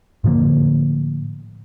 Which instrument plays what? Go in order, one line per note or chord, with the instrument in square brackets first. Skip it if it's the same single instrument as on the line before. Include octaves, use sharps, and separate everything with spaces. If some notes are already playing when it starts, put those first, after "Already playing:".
[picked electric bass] A2 D3 F3 A#3